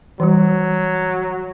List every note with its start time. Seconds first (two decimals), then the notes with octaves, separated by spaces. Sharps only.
0.20 E3 F#3 G3